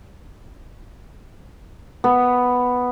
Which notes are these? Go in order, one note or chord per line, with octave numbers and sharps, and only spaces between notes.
B3